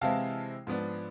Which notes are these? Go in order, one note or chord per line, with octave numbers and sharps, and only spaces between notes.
C3 E3 G#3 C4 E4 F5 A5
G#2 F3 B3 D4